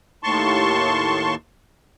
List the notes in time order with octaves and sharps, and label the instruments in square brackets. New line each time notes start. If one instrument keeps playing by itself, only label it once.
[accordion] D#2 A2 A5 C6 C#6